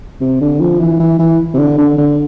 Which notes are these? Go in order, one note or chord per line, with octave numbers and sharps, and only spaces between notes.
C3
D3
F3
E3
E3
E3
C3
D3
D3
D3